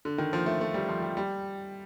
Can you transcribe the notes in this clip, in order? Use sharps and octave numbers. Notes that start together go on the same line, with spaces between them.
D3
D#3
F3
A3
A3
G3
F3
G3
G3